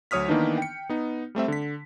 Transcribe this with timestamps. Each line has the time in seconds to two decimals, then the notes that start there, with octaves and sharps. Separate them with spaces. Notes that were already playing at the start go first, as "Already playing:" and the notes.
0.11 D2 F#3 C#5 D#6 F6 B6
0.28 D#3 E3 A#3 B3 D4 D#4
0.58 G5 C#7
0.89 B3 D#4
1.35 G3 A3 C4 E5
1.48 D3 B6